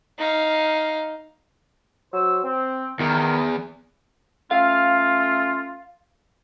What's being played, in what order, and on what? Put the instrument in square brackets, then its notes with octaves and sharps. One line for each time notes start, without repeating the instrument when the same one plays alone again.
[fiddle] D#4 F5
[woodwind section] F#3 C5 E6
C4
[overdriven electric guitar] E2 [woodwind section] D#3
[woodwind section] A3 C#4 F4 [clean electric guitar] F5